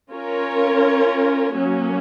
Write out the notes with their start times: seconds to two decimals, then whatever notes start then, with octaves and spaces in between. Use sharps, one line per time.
0.11 C#4 F4 A#4 C#5
1.55 F#3 A#3 C#4